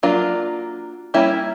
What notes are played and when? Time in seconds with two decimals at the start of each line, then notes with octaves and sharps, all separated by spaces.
0.03 F#3 A#3 D4 F4
1.14 G3 A#3 C#4 E4